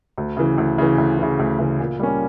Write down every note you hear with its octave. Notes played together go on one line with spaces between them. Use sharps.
D2
C#3 E3
D2
C#3 E3
D2
C#3 E3
D2
C#3 E3
A#2
G3 A#3 C#4